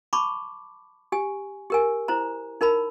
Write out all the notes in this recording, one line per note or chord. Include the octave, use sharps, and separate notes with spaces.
A5 B5 C#6 D6
G4 G#5
G4 A#4 G#5
E4 C5 A#5
D#4 A#4 A5 B5